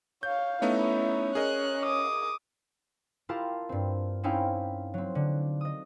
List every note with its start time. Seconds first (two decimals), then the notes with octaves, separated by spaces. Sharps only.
0.23 C#5 F5 G6
0.62 A3 B3 C#4 D#4 E4
1.35 G#4 A#4 D#5 F#6
1.83 D6 D#6
3.29 E4 F4 G4 A#4 F5 A5
3.69 G2 C4
4.23 C4 C#4 D#4 E4 F5 G5
4.94 F#3 C4
5.15 D3
5.61 D#5 D#6